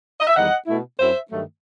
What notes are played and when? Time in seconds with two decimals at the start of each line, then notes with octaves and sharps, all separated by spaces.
0.20 D#5
0.27 E5
0.35 E2 D#3 G3 D#4 D#5 F#5
0.67 B2 A3 E4
0.99 F#2 F#3 C4 E4 C5 E5
1.31 G2 D#3 F#3 A3